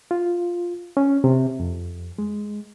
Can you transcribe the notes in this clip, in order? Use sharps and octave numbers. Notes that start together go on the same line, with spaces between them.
F4
C#4
C3
F2
G#3